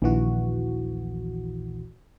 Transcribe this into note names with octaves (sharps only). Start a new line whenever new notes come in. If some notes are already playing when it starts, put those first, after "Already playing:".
A#1 D#2 E3 F#4